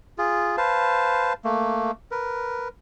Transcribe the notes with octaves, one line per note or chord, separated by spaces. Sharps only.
F4 G#4
B4 C5 F5 A5
A3 A#3
A#4 B4